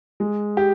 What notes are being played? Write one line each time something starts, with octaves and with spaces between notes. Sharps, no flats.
G#3
G4